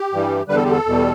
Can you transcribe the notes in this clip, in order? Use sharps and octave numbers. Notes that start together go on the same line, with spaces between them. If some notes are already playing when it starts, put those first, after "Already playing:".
Already playing: G4
G2 E3 G3
E2 D3 G3 B4
A4
G4
A4
E2 B2 G3